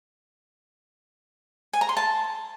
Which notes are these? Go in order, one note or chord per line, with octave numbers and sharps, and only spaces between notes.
G#5
A#5
C6
A5